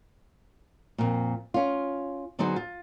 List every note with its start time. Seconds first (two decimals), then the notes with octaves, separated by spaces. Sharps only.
0.98 F2 A#2
1.54 C#4 F4
2.39 D3 F#3 B3 D#4 G#4 C5
2.56 F4